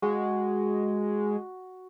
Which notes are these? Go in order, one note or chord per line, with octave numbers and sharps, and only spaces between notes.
G#3 F#4